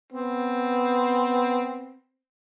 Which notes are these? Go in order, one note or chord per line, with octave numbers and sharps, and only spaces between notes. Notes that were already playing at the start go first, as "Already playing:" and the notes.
B3 C4